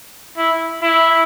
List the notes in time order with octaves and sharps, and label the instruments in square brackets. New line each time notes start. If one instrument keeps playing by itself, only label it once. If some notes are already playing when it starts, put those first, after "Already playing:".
[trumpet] E4
E4